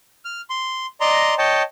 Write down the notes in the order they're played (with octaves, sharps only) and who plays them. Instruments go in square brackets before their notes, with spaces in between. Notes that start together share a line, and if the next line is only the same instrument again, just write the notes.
[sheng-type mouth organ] F6
C6
D5 D#5 A#5 C6
C#5 D#5 G5 A5